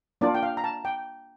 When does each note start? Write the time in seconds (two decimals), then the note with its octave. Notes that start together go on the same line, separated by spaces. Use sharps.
0.21 A#3 D4 F4 D5
0.35 G5
0.43 F5
0.57 A#5
0.64 A5
0.85 G5